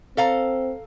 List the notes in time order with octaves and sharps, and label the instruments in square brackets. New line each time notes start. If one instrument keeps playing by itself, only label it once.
[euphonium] C4 [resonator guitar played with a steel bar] A4 F5 A#5